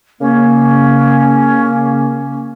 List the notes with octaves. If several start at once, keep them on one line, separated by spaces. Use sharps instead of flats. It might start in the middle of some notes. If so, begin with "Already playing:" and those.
C#3 A#3 C#4